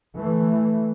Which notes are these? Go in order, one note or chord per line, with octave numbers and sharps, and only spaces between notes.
E3 A3